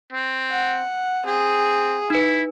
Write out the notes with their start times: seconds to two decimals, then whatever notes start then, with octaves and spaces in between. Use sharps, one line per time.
0.12 C4
0.51 F#5
1.26 C4 G#4
2.10 D#4 E4 B4